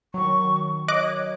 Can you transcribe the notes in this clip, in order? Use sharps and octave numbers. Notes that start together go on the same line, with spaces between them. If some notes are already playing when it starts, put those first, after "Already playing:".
D#3 F#3 C#6
C#5 D#5 D6 F#6